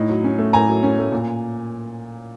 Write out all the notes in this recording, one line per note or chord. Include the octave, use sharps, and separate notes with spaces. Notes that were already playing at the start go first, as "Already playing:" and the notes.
Already playing: A2 D#4
F#3
C#4
A3
A2 G#5 A#5
F#3
C#4
A3
A#2